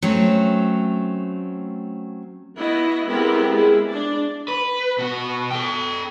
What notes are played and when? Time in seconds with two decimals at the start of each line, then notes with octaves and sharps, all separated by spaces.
0.02 F#3 A3 C4 C#4
2.56 B3 E4 F#4 D#5
3.07 G#3 B3 C4 E4 G4 A#4
3.53 G#3 E4 G#4
3.88 D4 D5
4.48 B4
4.98 B2 F#4
5.51 A4 G5